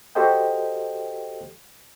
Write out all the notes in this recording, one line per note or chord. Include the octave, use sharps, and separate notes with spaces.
F#4 G4 A4 C5 D#5 G5